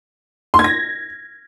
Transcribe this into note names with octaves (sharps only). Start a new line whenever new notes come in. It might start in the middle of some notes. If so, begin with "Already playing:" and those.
C6
G#6
A#6